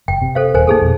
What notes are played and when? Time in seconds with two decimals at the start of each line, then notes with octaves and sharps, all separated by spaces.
0.08 F#1 G5
0.22 C3
0.35 A4 C5 F5
0.54 D#1 A#4 C5 G#5
0.67 A2 A#3 D#4 G#4 A4
0.81 F2 B2